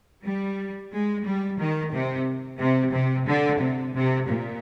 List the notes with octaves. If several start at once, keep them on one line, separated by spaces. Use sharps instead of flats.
G3
G#3
G3
D#3
C3
C3
C3
D3
C3
C3
A#2